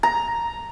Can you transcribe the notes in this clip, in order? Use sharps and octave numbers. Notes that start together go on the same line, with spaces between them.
A#5